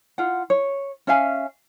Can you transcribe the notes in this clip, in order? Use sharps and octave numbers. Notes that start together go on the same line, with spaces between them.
F4 F#5
C#5
C#4 E5 F5 G#5